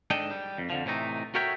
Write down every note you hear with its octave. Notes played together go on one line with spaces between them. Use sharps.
G#2 D4 A4 D#5 G5
G3
F2
F2 D3 F3
A2 C3 E3 A3 D#4
F#4 A4 A#4 C#5 E5 G5